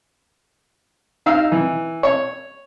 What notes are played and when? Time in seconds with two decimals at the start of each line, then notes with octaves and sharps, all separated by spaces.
1.26 D#4 F5 E6
1.52 E3
2.03 C#5